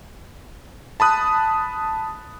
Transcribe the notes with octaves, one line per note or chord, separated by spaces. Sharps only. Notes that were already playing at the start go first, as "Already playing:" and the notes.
A5 B5 D#6 F#6